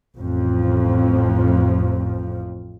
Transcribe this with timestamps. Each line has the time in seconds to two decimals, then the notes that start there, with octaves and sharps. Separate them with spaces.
0.15 A1 F2 F3